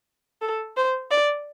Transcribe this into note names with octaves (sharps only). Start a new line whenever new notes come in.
A4
C5
D5